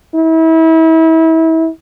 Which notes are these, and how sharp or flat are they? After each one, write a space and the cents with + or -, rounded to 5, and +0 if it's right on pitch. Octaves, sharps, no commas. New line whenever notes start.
E4 -30